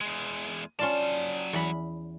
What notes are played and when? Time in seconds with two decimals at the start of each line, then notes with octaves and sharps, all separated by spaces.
0.01 E2 G#3
0.79 F#3 C#4 F4 D5 A5
1.53 E2 B5